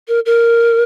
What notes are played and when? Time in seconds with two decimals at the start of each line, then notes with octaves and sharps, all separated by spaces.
0.08 A#4
0.26 A#4